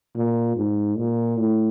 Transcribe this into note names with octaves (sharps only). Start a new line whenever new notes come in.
A#2
G#2
A#2
A2